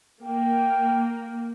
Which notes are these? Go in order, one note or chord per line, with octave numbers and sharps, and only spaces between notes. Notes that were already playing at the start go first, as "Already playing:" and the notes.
A#3 G5